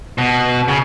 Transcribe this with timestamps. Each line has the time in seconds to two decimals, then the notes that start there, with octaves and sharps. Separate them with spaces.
0.18 B2
0.68 C#3